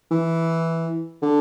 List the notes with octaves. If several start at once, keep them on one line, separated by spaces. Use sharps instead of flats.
E3
D3